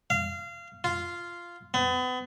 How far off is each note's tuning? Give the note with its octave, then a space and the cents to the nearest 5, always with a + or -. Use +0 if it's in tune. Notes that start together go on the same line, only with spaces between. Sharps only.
F5 -25
F4 -5
B3 +35